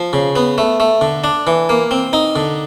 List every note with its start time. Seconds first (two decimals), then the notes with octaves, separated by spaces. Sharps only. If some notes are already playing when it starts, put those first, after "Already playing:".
Already playing: F3
0.13 C#3
0.36 B3
0.58 A3
0.80 A3
1.01 D3
1.24 D4
1.47 E3
1.69 A#3
1.91 C4
2.13 D#4
2.36 D3